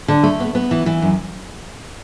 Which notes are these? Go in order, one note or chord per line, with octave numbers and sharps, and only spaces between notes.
D3
A3
B3
B3
E3
E3
F#2